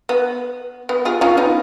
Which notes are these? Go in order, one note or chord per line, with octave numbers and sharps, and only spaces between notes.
B3
B3
F4 G#4
C#4 F4
B3 D#4